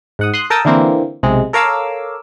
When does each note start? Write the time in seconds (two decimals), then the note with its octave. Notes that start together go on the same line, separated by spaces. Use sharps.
0.19 G#2 F#5 D#6
0.34 C6 D#6 F#6
0.50 A4 A#4 G5 A5 D#6 E6
0.65 D3 E3 A#3 C4
1.23 B1 C3 G#3
1.53 A4 A#4 C#5 F5 D6 E6